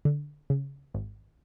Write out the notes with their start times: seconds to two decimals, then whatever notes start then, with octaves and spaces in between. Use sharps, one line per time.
0.05 D3
0.50 C#3
0.94 G#1